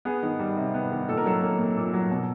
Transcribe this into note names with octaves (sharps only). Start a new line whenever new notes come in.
B3 G#4
D#3
G3
C3
B3
D#3
A#2 A4
A#4
F#3 A4
A#3
A#2
A#2
F#3
B2